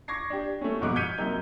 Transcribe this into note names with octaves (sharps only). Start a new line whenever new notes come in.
C#6 D6 G#6 A#6 C7
D4 G4
A3 C#4
G1 G#2 B2 F3 D6 F#6
F6 G6 G#6 B6 C#7 D#7
F#2 C3 A#3 D#4 G6 G7